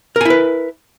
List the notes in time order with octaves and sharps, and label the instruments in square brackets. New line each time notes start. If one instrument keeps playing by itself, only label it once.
[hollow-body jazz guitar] A#4
G#5
E4
B4